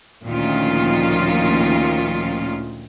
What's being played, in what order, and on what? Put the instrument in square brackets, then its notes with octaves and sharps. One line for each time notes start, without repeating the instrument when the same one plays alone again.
[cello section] D2 A#2 D#3 F3 C#4 F4